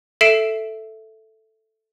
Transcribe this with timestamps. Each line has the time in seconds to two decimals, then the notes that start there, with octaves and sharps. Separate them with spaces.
0.21 A4 E5 C7 D7 E7